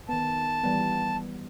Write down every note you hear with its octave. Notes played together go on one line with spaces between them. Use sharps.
D#3 B3 A5
E3 G3 B3